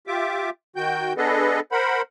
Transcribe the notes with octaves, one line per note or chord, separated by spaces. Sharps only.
F4 G4 E5 D6
D#3 F#4 G5 G6
B3 D4 G#4 A4 B4 D#5
A#4 C5 F#5 B5